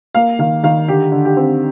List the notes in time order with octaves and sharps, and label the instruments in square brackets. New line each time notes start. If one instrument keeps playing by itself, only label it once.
[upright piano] A#3 F5
D#3 F5
D#3 F5
D3 G4
D3
G4
C4